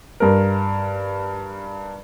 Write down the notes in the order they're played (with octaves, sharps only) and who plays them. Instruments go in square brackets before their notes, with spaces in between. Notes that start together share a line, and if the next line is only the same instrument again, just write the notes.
[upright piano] G2 A#4